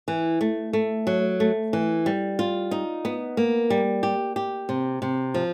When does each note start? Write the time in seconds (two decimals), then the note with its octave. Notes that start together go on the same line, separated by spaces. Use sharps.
0.08 E3
0.41 A3
0.73 A3
1.07 F#3
1.40 A3
1.73 E3
2.06 G3
2.39 F4
2.71 D#4
3.05 B3
3.37 A#3
3.70 G3
4.03 G4
4.36 G4
4.69 C3
5.02 C3
5.34 F3